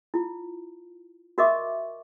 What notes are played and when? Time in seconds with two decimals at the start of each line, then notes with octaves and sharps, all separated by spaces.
0.14 E4 F4
1.38 F#4 A#4 D#5 E5 C#6 D6